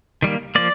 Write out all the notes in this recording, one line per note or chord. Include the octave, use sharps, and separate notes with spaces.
D#3 G3 A#3
F3 A#3 D5